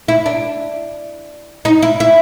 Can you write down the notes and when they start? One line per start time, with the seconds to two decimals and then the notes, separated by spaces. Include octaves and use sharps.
0.08 E4
0.26 D4
1.65 D#4
1.82 E4
2.00 E4